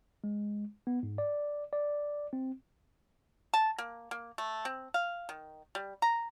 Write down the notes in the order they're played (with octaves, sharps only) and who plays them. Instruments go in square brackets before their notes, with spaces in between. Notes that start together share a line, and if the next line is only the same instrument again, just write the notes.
[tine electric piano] G#3
B3
G#2
D5
D5
C4
[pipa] A5
A#3
A#3
A3
C4
F5
D#3
G3
A#5